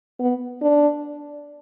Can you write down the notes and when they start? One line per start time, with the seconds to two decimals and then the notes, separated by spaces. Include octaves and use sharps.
0.19 B3
0.61 D4